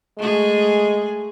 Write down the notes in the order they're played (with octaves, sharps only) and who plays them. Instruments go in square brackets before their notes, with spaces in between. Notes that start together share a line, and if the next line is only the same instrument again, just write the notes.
[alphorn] G#3 [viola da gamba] A3 G#4